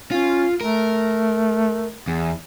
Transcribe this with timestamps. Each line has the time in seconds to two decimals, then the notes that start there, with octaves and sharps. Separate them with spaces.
0.11 C#4 F4
0.61 A3 A#4
2.07 E2